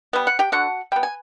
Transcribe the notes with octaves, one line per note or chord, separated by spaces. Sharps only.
G3 B3
F#5
G4 G5
D3 F#4 F#5
G3 B3 G5
G#5